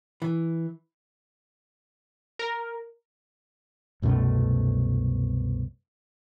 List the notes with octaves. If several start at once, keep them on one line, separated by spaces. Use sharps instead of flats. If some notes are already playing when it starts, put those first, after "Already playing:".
E3
A#4
C2 F#2 B2 A3